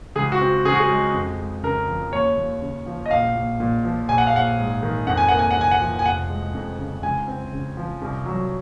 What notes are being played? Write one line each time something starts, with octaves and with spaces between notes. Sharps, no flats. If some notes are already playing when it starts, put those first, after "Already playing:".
C#2 G#4
F#4
C4
C#3 G#4
F#4
G#4
G#3
F2
G#3
C#3 A#4
F3
D#2 C#5
D#2
C#3
F3
D#5
A#1 F5
A#1
A#2
F3
A#1 G#5
F#5
F5
A#1 F#5
G#2
D#3
F2 F#5
G#5
A#3 F#5
G#5
F#5
C3
G#5
F#5
F3
G#5
F1 F#5
G#3
F2
C#3
C#2 G#5
C4
C#3
F3
C2
F#3